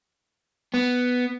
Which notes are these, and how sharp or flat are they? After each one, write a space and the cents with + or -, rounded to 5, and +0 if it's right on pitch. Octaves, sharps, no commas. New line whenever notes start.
B3 +5